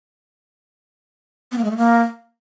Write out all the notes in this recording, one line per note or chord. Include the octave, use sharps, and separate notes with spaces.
B3
A#3
G#3
A3
A#3